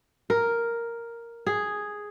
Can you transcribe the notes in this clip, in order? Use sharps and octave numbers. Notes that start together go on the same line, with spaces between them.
A#4
G#4